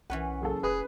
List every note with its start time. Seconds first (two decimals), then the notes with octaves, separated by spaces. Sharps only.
0.10 B1 E3 C#4 B4 F#5
0.41 F#1 G#4 A4
0.63 F1 G#4 B4